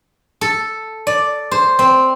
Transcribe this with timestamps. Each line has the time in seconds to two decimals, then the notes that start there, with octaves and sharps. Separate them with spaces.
0.41 A4
1.07 D5
1.51 C5
1.79 C4